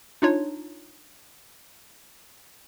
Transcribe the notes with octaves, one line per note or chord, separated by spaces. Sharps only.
D4 D#4 F4 C#5